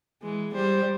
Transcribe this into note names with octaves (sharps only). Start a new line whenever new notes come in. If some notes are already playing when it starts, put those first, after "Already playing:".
E3 G#3
G3 C5